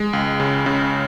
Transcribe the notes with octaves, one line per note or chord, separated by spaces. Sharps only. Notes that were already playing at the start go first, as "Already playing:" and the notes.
Already playing: G#3
C#2
C#3
C#3